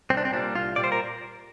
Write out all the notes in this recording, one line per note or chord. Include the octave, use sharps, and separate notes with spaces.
C2 C4
D4
C4
A#2 G3 D4
C2 F4
A#2 G3 D5
C5
A#4